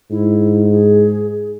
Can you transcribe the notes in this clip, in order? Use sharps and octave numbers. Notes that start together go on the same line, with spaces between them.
G#2 E4
G#4